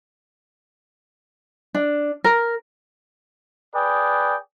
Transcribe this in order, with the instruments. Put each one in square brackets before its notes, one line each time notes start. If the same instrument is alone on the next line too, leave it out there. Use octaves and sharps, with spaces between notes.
[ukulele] D4
A#4
[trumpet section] G#4 B4 D5 G5